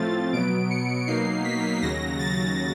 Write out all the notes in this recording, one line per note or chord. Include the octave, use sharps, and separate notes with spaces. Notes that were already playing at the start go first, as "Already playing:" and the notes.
Already playing: A2 F3 A3 C4 F4 A6
B2 F#3 B3 D7
C#7
B2 F#3 A#3 D#4 C7
B6
D#2 C#3 F#3 A#6
A6